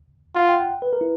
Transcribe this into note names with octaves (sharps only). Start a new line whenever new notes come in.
F4 F#5
G5
F#5
B4
A#4
E4